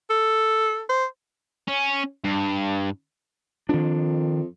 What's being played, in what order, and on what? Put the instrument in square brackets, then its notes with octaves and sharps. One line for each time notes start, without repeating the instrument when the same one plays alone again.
[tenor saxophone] A4
C5
[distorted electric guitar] C#4
G2
[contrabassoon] F2 [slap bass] D#3 D4